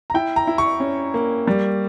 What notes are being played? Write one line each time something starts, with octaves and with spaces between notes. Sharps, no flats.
A#5
E4 G5
A#5
E4
C#6
C#4
A#3
G3